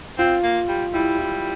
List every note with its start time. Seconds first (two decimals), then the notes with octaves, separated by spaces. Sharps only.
0.18 C4 F4
0.43 A#3
0.68 G3
0.93 G3 E4
1.18 E4